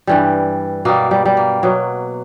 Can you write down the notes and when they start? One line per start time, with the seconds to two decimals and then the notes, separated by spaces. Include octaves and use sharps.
0.07 G2 E3 G3
0.85 B2 G3 A#3
1.11 G3
1.25 G3
1.37 A#3
1.63 B2 F#3